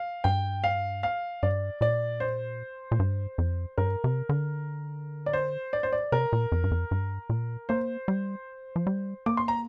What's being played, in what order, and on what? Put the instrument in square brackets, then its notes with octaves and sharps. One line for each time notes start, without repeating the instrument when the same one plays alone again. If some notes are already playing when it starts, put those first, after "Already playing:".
Already playing: [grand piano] F5
[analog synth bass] G2 [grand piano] G5
[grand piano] F5
F5
[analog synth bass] G2 [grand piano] D5
[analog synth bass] A#2 [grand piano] D5
[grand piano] C5
[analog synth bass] A#2
G2
F2
[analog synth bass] G2 [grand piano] A#4
[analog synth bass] C3
D3
[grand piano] D5
C5
D5
C5
D5
[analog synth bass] C3 [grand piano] A#4
[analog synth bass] A#2
F2
G2
F2
G2
A#2
[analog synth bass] A#3 [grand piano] C5
[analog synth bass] G3
F3
G3
[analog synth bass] A#3 [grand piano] D6
[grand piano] C6
A#5